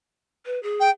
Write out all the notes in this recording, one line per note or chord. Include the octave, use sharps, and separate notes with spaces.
B4
G#4
G5